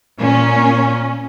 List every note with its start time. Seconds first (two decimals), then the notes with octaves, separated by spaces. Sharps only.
0.18 A#2 C#4